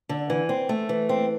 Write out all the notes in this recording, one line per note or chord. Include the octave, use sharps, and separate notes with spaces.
D3
E3
C4
A3
E3
C4